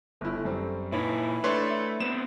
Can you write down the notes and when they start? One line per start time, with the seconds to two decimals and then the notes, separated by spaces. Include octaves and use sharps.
0.21 G1 A3 E4
0.45 F#2 G3 C4
0.92 A#2 E3 D#4 E4 C#5
1.44 A3 D4 B4 C#5 C6
1.71 E4
2.00 B3 C4 E7